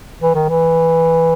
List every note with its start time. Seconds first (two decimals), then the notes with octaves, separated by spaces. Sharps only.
0.22 E3
0.35 D#3
0.49 E3